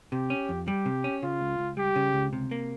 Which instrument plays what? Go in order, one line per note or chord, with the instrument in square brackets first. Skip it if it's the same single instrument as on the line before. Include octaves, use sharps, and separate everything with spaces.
[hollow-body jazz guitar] C3 [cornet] G4
[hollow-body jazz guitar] C#4
F2
[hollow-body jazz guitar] G3 [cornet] G4
[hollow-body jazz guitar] C3
C#4
[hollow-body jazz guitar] C#3 [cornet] F4
[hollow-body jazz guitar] C#2
C#2
[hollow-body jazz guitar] G3 [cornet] G4
[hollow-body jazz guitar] C#3
C#2
C3
A#3